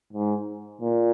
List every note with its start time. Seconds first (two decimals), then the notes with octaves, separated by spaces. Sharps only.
0.13 G#2
0.81 A#2